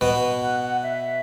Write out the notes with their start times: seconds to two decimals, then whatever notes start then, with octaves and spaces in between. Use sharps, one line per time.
0.01 B2 B3 B4
0.42 F#5
0.62 F#5
0.83 E5